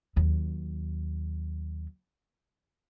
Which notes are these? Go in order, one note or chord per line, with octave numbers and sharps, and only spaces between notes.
D#2 F#3